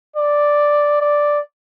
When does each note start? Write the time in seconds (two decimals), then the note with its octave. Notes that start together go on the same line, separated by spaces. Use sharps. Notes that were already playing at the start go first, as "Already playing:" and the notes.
0.16 D5
1.01 D5